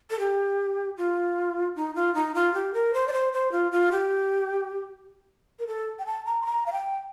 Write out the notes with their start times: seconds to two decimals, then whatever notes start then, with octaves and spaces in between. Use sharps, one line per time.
0.10 A4
0.19 G4
0.97 F4
1.76 D#4
1.95 F4
2.15 D#4
2.35 F4
2.54 G4
2.74 A#4
2.94 C5
3.07 D5
3.13 C5
3.33 C5
3.52 F4
3.72 F4
3.92 G4
5.59 A#4
5.67 A4
5.99 G5
6.06 A5
6.26 A#5
6.42 C6
6.45 A#5
6.66 F5
6.72 G5